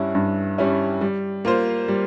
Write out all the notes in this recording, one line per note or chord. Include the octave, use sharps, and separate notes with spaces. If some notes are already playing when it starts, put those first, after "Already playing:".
Already playing: G2 G3 C#4 E4
G2
G3 C#4 E4
G3
A#3 F4 C5
G3